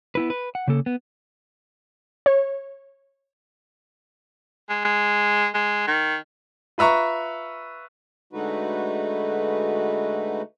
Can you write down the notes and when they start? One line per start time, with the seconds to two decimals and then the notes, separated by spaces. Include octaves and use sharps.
0.15 B3 E4 B4
0.30 B4
0.55 F#5
0.68 C#3 A#3 A4
0.86 B3
2.26 C#5
4.70 G#3
4.85 G#3
5.55 G#3
5.88 D#3
6.78 F4 B4 E5 A#5 C#6
8.33 D3 G#3 A3 D#4 F#4 B4